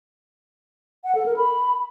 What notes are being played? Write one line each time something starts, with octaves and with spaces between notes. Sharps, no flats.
F#5
A4
A#4
B5